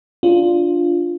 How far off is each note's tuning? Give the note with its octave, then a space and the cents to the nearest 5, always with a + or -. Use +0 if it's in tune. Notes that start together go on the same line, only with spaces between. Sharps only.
D4 -5 F4 +0